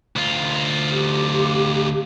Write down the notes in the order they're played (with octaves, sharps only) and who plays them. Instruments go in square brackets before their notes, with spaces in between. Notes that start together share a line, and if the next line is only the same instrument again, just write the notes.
[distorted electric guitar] D2 F4
[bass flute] G4